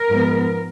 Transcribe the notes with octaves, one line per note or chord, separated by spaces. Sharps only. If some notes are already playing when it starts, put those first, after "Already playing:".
Already playing: A#4
G#2 F3 G#3 B3